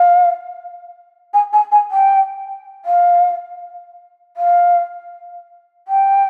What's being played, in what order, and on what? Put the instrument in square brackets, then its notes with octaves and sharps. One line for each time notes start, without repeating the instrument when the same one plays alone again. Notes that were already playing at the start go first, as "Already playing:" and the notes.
Already playing: [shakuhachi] F5
G#5
G#5
G#5
G5
F5
F5
G5